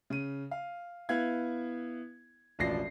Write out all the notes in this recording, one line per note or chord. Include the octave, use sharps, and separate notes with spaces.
C#3 D#7
F5
B3 E4 F5 G#6
E1 A1 F3 D5 A#6 C7